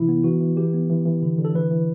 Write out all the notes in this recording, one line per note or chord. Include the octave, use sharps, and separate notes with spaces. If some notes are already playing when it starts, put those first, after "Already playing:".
Already playing: C3 E3 E4
B3
E3 F#4
E3
E3 G4
B3
E3
E3
D3
D3
A4
E3 B4
E3